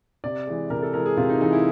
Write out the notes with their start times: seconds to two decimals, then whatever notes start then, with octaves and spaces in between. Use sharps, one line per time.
0.24 C3 D5
0.47 E3 G#3
0.70 C3 A#4
0.82 A4
0.94 E3 G#3 A#4
1.06 G#4
1.17 C3 F4
1.29 D#4
1.41 E3 G#3 D#4
1.53 E4